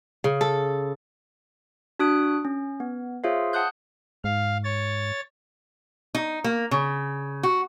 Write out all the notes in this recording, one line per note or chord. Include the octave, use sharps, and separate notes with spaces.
C#3
A4
D4 F#4 D#6 F#6 D7
C#4
B3
F4 G#4 C5 C#5 E5 F5
F#5 A5 D#6 F#6 G6
G#2 F5
C#5 A6
D#4
A#3
C#3
F#4